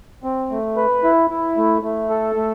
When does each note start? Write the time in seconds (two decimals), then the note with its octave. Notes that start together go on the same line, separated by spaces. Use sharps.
0.24 C4
0.51 A3
0.76 B4
1.04 E4
1.30 E4
1.57 A3
1.83 A3
2.10 A4
2.36 A3